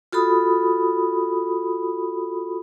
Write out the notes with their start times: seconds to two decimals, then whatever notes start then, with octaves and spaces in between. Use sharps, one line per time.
0.12 F4 F#4 A4 B5 D#6